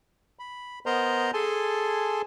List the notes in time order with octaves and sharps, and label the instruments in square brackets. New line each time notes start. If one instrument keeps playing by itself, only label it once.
[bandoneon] B5
B3 A#4 C5 D#5 A#5 C6
G#4 A4 G#5 A5 C6